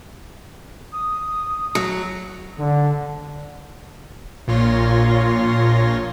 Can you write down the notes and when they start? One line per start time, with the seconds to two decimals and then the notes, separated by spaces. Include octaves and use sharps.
0.93 D#6
1.75 F#3
2.59 D3
4.47 A#1 A#2 F4 C#5 C6 A#6